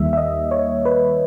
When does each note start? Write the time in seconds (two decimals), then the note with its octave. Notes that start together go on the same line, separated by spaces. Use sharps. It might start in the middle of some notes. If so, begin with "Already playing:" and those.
Already playing: D#2 D#3 G3 A#3 E5
0.13 E5
0.17 D#5
0.51 C#5
0.85 B4